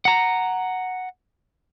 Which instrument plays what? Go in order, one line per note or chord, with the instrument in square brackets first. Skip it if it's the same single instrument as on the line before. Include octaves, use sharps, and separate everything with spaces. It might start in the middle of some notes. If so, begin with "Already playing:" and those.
[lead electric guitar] F#5 A#5